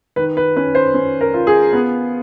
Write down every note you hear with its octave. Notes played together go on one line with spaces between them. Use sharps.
D#3 B4
B4
C#4 B4
C5
C#4
A#4
F4
G#4
B3